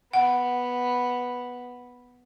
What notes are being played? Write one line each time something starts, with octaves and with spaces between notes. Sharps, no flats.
B3 F#5